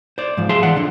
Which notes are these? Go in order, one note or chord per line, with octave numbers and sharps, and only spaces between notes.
C5 D5
G#2 F3
G#4 E5 F5 A5 C6
E3 D5 F#5
D3 F3